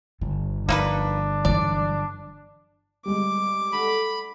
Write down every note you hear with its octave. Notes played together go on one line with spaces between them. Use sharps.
G1 D3
F3 A#3 D4 D#4 B4
E3 F#3 D5
G3 G#3 D6
A3 D4 F#4 B5